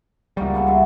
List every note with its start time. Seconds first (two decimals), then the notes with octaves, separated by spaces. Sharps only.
0.37 C#2 G3 A#3 F#4 G#4
0.55 B3 F#5 A5
0.66 E5 G#5 C6